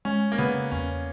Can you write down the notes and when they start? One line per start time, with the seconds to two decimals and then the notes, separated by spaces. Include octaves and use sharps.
0.05 G#3 C#4
0.32 A#3
0.38 C#3 B3
0.71 E2 C#4